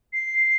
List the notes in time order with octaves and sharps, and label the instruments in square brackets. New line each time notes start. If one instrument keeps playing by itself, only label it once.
[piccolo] C7